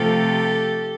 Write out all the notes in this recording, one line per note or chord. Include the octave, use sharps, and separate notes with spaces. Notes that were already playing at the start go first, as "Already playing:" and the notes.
Already playing: C3 F3 A3 G4 A4